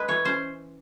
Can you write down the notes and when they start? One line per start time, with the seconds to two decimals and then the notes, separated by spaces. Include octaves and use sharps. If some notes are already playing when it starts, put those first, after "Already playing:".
Already playing: G#3 B4
0.08 E3 C#5
0.25 C#4 C5